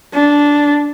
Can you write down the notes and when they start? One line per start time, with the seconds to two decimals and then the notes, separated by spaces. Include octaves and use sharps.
0.14 D4